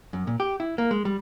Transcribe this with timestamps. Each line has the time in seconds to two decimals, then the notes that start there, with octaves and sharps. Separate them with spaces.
0.13 F#2
0.27 A#2
0.40 G4
0.60 E4
0.78 A#3
0.91 G#3
1.05 G3